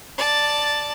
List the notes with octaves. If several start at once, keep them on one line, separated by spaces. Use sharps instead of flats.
D5 A5